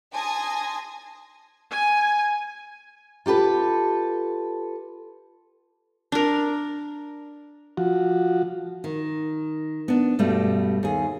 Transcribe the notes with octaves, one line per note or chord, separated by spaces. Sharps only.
G#5 A5 C6 D#6 G#6 A#6
G#5
F4 G4 A4 B4
D4 A#4
F3 F#4
D#3
B3 D4
G2 B2 G3 A3
D#2 G#4